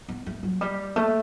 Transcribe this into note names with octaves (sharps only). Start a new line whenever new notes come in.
B3
A3
F#3
G3
A3